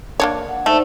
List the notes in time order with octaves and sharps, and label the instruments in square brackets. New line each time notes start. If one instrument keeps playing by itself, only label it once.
[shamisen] A#3 D4 C#5
[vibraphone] F#5
[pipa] A3 [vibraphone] D#4 C5 D5